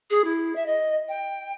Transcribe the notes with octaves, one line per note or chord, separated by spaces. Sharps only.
G#4
E4
E5
D#5
G5